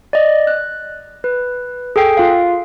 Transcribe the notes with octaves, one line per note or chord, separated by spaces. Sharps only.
D5 D#5
F#6
B4
G#4 A4 G5 C7
F4 F5